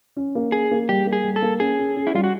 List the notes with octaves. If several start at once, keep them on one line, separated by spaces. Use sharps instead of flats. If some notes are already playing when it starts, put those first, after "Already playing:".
C#4
A#3
C#4 G#4
A#3
G3 G4
A#3
G#4
G3
A4
A#3
C#4 G#4
C#4
C#4
E4
G3 F4
F#4